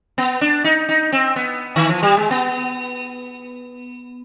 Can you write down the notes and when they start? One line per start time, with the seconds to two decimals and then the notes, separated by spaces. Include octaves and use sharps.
0.18 B3
0.41 D4
0.64 D#4
0.89 D#4
1.12 C4
1.36 B3
1.76 D#3
1.89 F3
2.03 G3
2.17 G#3
2.31 B3